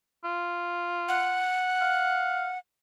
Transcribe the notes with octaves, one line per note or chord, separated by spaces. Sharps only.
F4
F#5
F5